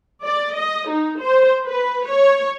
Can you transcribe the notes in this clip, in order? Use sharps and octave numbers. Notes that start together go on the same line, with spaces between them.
D5
D#5
D#4
C5
B4
C#5